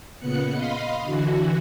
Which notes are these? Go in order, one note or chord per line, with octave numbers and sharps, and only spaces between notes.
A#2 C#3 B3 F#6 C#7
D#5 F5 B5 C6
D3 E3 F#4